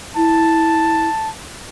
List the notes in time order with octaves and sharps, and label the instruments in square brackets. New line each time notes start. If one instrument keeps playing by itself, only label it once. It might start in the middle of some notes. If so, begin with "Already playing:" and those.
[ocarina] E4 [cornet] A5